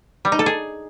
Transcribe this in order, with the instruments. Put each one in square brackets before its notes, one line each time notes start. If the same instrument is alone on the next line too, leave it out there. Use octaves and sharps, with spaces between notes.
[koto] G3
D#4
A4
G#4